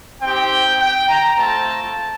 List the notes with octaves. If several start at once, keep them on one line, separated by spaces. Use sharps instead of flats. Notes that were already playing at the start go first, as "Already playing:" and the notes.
C4 D#4 G4 G5
G5
A#5
A3 C4 F4 A5